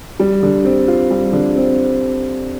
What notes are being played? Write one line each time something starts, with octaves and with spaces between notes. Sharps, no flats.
G3
D3
C4
F4
G3
D3
C4